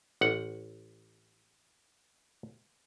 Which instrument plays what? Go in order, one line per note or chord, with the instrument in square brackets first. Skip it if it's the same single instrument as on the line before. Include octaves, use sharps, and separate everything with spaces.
[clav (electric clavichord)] A1 F#5